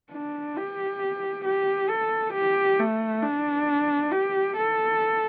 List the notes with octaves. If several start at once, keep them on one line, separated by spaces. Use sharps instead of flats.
D4
G4
G4
A4
G4
A3
D4
G4
A4